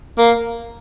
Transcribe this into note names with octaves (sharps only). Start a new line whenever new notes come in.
A#3